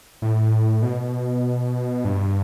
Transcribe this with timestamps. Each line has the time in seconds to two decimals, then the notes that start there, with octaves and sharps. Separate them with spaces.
0.22 A2
0.83 B2
2.05 G2